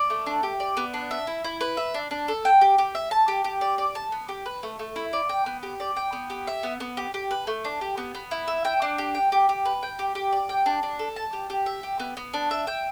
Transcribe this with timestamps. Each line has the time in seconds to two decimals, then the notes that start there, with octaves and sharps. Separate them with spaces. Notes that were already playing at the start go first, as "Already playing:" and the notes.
Already playing: D5
0.10 A3
0.26 D4
0.43 G4
0.60 D5
0.77 B3
0.94 D4
1.11 E5
1.27 E4
1.44 E4
1.61 B4
1.77 E5
1.94 D4
2.11 D4
2.28 A4
2.45 G5
2.61 G4
2.78 G4
2.95 E5
3.11 A5
3.28 G4
3.44 G4
3.61 D5
3.78 D5
3.95 A5
4.12 B3
4.29 G4
4.46 B4
4.63 A3
4.79 A3
4.96 E4
5.13 D5
5.29 G5
5.46 B3
5.63 G4
5.80 D5
5.97 G5
6.13 B3
6.30 G4
6.47 E5
6.63 B3
6.80 B3
6.97 G4
7.14 G4
7.31 B4
7.47 A3
7.64 D4
7.81 G4
7.97 B3
8.15 B3
8.31 E4
8.48 E5
8.65 G5
8.82 D4
8.98 G4
9.14 G5
9.32 G4
9.49 G4
9.65 B4
9.83 G5
9.99 G4
10.15 G4
10.32 D5
10.49 G5
10.66 D4
10.83 D4
10.99 A4
11.16 A5
11.33 G4
11.50 G4
11.66 E5
11.83 G4
12.00 B3
12.17 B3
12.33 D4
12.51 E5
12.67 G5